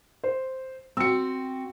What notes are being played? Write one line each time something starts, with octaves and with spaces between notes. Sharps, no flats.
C5
C4 F#4 E6 C#7